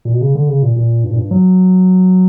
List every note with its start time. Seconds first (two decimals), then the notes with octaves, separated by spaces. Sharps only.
0.05 A#2
0.13 B2
0.21 C#3
0.35 D3
0.49 C#3
0.63 A#2
0.76 A#2
1.04 G2
1.11 A#2
1.19 G2
1.31 F#3